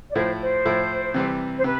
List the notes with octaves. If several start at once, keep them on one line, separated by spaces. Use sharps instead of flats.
D5
A2 F3 A3 E4 C5
C5
A2 F3 A3 E4
C3 E3 G3 C4
C5
C3 B4